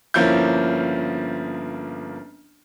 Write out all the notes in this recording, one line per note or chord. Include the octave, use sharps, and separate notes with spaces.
G1 F3 A#3 C#4 E4 G6